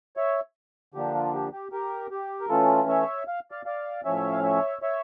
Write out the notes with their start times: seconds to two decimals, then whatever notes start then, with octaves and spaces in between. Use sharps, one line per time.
0.17 C#5 E5
0.94 D3 F3 A#3 D4 G4
1.14 F4
1.34 G4
1.52 G4
1.72 G4 A#4
2.11 G4
2.41 A#4
2.49 E3 A3 C#4 F4 A4
2.89 C#5 E5
3.28 F5
3.51 D5 F5
3.66 D5 F5
4.05 A2 F3 C#4 C#5 E5
4.32 F5
4.43 C#5 E5
4.82 C#5 E5